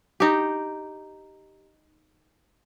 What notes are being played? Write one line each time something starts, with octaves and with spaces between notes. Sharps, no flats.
D#4 G4